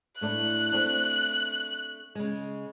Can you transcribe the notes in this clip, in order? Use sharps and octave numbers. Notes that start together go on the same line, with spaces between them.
A2 A3 D4 F#6
A3 C4 D4
C#3 G#3